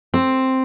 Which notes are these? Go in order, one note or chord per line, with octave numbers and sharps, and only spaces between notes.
C4